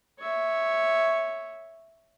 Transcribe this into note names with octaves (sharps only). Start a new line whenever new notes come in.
C#5 E5